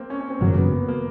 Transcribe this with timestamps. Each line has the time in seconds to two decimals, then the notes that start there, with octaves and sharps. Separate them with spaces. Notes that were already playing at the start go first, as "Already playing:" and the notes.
Already playing: A#3 C4
0.10 C#4
0.21 C#4
0.30 C4
0.41 G#1 F#2 C#3 F#3 A#3
0.57 B3
0.73 B3
0.88 A#3